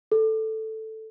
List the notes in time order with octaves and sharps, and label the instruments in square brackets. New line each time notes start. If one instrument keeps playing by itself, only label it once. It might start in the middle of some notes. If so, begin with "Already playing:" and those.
[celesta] A4